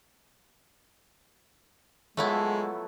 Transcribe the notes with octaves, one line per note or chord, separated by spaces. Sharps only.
F3 F#3 G#3 A3 B3 E4 A4